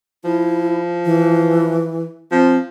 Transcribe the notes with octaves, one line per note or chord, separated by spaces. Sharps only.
F3 E4
E3
F3 C4